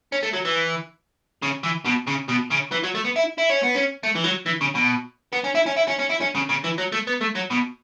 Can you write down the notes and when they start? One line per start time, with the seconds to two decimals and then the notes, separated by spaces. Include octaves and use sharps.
0.12 C#4
0.23 A3
0.33 F#3
0.45 E3
1.43 C#3
1.63 E3
1.85 B2
2.08 C#3
2.29 B2
2.51 C#3
2.72 E3
2.84 F#3
2.95 A3
3.05 B3
3.16 E4
3.38 E4
3.50 C#4
3.63 B3
3.75 C#4
4.03 A3
4.15 E3
4.24 F#3
4.46 E3
4.61 C#3
4.75 B2
5.33 B3
5.44 C#4
5.55 E4
5.66 C#4
5.76 E4
5.88 C#4
5.99 C#4
6.10 E4
6.20 C#4
6.35 C#3
6.49 C#3
6.64 E3
6.78 F#3
6.92 A3
7.07 B3
7.21 A3
7.35 F#3
7.51 B2